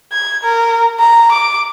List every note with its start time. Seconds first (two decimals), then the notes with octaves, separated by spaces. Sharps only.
0.12 G#6
0.43 A#4
1.00 A#5
1.32 D6